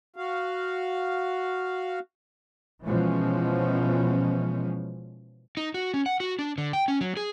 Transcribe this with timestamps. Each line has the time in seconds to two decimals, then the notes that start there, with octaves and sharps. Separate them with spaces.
0.16 F#4 F5
2.86 B2 E3 F3 G#3 C#4
5.57 D#4
5.74 F#4
5.94 C#4
6.06 F#5
6.20 F#4
6.39 D4
6.58 D3
6.73 G5
6.88 C#4
7.01 F#3
7.17 G#4